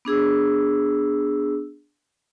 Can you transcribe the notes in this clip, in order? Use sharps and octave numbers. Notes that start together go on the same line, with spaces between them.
B3 D4 G#4 E6